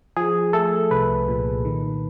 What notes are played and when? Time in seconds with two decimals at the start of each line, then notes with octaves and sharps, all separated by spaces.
0.17 F3 G#4
0.53 A3 A4
0.91 C2 B4
1.28 A#2
1.65 D#3